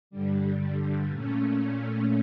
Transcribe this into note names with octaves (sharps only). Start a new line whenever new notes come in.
G2 D3 G3
A#2 A3 C#4